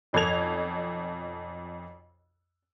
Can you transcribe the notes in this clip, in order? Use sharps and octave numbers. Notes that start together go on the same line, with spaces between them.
B1 F2 A4 G#6 F7